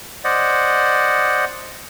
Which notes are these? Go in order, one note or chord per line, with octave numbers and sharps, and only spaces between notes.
C5 D5 D#5 F#5